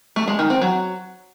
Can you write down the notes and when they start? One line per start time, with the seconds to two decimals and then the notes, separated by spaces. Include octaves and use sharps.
0.16 A3
0.28 G#3
0.39 D#3
0.50 C4
0.61 F#3